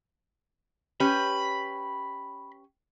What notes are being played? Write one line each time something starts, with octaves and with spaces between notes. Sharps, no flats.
C#4 G4 B4 B5